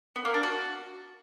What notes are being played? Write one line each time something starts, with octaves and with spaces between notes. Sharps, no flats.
B3
A#3
D4
F#4